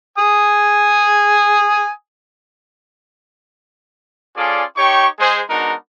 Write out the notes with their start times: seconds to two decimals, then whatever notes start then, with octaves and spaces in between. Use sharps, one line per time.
0.18 G#5 D#6
4.36 C#4 F4 G#4 A4 D5
4.77 D#4 G4 C#5 G5 C#6
5.19 G#3 G#4 C5
5.48 G#3 B3 D4 D#4 F#4 A#4